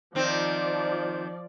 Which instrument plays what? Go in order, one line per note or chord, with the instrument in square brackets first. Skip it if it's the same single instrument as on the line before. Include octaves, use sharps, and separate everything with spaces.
[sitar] D#3 C4 [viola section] F3 D5